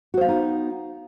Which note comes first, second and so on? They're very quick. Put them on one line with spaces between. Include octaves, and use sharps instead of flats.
F#4 C5 F5 B3 D#4